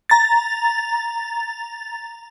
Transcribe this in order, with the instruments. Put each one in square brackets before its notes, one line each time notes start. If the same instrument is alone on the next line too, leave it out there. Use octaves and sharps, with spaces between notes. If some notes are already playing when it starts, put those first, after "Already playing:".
[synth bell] A#5 A6